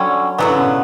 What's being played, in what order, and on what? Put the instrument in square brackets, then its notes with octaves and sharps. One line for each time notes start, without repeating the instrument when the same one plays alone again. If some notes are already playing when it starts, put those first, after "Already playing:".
Already playing: [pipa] D3 G3 C#4 [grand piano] F#3
[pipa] D3 F#3 B3 [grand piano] E3
[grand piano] C#3
B2